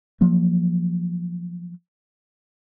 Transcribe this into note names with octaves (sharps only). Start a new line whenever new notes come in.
F3 F#3 A#3